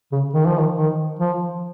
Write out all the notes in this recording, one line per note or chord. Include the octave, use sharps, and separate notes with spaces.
C#3
D#3
F3
D#3
D#3
F3